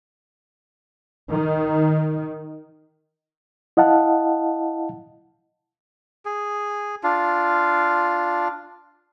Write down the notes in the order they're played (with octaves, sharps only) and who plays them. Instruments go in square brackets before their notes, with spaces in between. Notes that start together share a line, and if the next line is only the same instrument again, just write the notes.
[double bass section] D#3
[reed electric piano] E4 D#5 F5 F#5 A5
[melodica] G#4
D4 F4